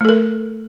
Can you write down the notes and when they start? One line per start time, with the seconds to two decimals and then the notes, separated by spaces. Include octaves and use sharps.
0.01 A3
0.05 A4
0.09 A#4